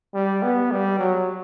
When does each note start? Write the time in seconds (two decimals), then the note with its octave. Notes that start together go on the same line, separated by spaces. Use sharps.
0.14 G3
0.43 B3
0.71 G3
0.98 F#3